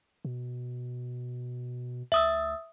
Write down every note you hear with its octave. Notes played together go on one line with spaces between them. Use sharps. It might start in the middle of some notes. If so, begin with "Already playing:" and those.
B2
D2 E5 D#6 E6